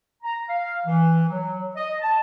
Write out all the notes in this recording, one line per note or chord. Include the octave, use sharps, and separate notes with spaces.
A#5
F5
E3
F#3
D#5
A5